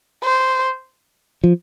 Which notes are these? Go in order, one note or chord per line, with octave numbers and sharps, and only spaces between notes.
C5
F3